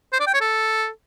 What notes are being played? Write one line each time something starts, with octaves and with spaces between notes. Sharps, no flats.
C5
D5
G5
C#5
A4